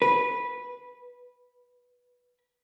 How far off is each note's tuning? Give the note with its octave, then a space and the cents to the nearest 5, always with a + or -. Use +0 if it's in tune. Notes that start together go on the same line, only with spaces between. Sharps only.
B4 -10